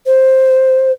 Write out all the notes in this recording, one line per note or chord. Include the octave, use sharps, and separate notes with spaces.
C5